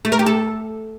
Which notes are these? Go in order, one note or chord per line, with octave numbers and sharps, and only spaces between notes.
A3
A#4
G4
A4